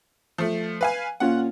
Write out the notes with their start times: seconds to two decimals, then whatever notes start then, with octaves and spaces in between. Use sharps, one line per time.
0.38 F3 A3
0.81 B4 F5 G#5
1.20 A#2 C#4 F4 F#5